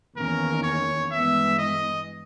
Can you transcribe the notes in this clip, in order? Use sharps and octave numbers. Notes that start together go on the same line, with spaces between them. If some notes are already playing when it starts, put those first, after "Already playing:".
E2 D#3 A#3 C#4 A#4
C#5
G2 E3 G#3 B3 E5
D#5